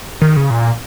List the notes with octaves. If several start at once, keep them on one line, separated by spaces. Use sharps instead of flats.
D#3
C#3
A#2